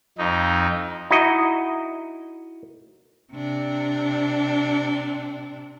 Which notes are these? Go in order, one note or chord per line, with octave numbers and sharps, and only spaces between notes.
F2 D#4
D#4 E4 F#4 D#5
C3 D4